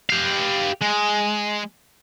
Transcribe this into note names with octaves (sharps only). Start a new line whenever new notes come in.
G4 F5
G#3